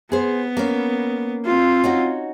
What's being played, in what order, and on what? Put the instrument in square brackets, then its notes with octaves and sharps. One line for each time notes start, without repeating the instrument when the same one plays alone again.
[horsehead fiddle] B3 [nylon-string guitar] G#4 C5
[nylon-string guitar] A#3 C#4
[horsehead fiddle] C4 F4
[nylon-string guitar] C#4 D#4 F#4